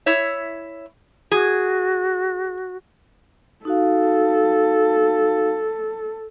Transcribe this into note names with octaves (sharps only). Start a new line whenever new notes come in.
E4 C#5 E5
F#4 G#4
D#4 F#4 A4 F5